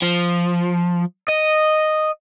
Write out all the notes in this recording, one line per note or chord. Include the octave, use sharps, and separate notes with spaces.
F3
D#5